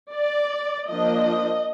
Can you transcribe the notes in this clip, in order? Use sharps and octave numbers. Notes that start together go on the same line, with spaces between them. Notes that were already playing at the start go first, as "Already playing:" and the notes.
D5
F3 A#3 D4 D#5